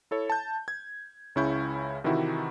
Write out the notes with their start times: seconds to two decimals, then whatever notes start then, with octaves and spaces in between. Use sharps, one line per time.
0.11 E4 A4 C#5
0.30 A5 G6
0.68 G#6
1.35 C#2 C#3 C#4 E4 C#6 G6
2.04 C3 D#3 E3 D#4 E4 F#4